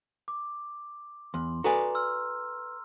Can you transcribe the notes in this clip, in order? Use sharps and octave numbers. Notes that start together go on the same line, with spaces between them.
D6
E2 C6
F#4 A4 B4 D5 G#5 A#5
C6 E6 F6